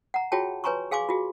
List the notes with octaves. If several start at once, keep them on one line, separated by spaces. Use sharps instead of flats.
F#5 A#5
F4 F#4 G#4 C#5 G5 A5
B4 C#5 G#5 A#5 C6 C#6
G#4 F5 G#5 C6 D6
F4 F#4 G#4